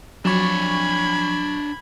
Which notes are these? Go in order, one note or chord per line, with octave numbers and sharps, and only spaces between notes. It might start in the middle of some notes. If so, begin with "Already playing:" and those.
F2 F#3 D4 C#5 B5 C#6 G#6